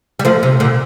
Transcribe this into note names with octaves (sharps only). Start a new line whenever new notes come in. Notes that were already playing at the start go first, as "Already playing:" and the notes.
G3
F3 A3
C3
A#2 D3